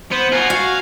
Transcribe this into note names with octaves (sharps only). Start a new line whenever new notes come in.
B3 C5
B2 F4 F#5 G#5 A#5
F#4 F5